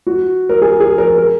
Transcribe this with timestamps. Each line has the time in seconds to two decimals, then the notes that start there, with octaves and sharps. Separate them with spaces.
0.07 F#4
0.49 A#4
0.62 G#4
0.80 G#4
0.98 A#4
1.17 A#4